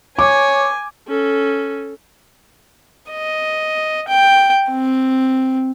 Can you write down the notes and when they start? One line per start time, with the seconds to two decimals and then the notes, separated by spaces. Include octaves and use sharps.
0.19 C#5 G#5 D6
1.08 C#4 A4
3.11 D#5
4.08 G5
4.71 C4